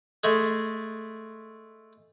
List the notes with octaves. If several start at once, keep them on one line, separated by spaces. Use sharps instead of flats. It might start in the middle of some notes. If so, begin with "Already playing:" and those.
G#3 A3